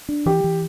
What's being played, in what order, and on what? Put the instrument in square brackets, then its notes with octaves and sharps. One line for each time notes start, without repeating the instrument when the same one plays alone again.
[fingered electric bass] D4
[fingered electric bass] E3 [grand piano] G4
[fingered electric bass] E3